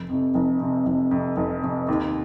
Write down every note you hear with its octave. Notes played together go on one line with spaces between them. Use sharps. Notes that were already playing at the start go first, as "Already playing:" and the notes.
Already playing: F1
F2 C3
F1
F2 C3
F1
F2 C3
F1
F2 C3
D#2